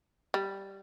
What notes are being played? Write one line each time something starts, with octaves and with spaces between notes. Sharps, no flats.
G3